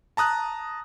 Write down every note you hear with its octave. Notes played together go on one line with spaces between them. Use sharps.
A5 A#5 D#6 F#6